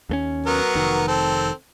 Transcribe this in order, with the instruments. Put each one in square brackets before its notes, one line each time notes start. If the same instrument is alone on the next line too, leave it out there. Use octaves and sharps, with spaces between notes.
[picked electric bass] D#2 A3 C#4
[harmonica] F#3 B3 A#4
[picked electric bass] F1 D#3
[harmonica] C4 A4